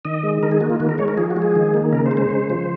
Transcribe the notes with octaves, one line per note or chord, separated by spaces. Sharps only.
D#3 D#5
G#3
D#3 A#4
G#4
A#3 F#4
F4
D#3 F#4
A#4
G#3 C#5
A#4
F3 G#4
F#4
G#3
G#4
D#3
A#3
C#3 A#4
C5
G#3
C5
C#3
F3